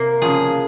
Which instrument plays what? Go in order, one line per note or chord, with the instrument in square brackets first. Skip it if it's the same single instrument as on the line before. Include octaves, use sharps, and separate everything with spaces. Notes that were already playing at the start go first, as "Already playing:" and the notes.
Already playing: [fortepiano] C3 [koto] A#3
[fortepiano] C#3 F3 [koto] G#4